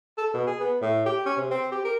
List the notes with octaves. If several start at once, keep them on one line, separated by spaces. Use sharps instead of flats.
A4
B2
G#4
B3
A2
G4
C#4
C3
C4
G4
A#4